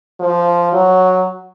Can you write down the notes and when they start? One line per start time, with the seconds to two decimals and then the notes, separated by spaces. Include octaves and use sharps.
0.20 F3
0.73 F#3